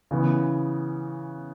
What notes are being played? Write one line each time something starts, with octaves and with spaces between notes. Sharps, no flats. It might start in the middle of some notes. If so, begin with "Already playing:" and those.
C#3 E3 B3